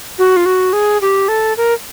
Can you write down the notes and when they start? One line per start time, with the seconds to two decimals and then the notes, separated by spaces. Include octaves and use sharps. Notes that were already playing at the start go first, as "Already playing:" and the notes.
0.19 F#4
0.36 F4
0.46 F#4
0.73 G#4
1.02 G4
1.28 A4
1.57 A#4